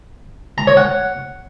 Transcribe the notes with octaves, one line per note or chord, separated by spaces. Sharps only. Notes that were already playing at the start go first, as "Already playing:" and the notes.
A#5
C#5
F#5